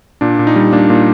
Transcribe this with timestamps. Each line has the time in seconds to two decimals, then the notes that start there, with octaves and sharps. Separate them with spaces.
0.21 A#2 D4
0.39 A#2
0.47 D#4
0.56 G3
0.73 A#3 D4
0.90 A#2